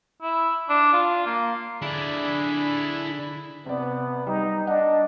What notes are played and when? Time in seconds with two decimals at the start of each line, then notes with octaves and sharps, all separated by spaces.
0.22 E4
0.69 D4
0.93 F4
1.26 A#3
1.82 D3 D4 E4 G#4 D5 B5
3.66 C3 B3 D5
4.27 G3 D#4
4.67 D4 D#5 F#5